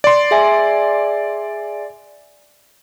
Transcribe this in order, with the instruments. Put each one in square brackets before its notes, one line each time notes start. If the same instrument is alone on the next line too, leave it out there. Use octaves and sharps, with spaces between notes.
[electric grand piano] D5 C6
[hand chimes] G#4 E5 G#5